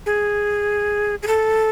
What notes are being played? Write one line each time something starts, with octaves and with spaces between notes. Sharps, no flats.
G#4
G#4
A4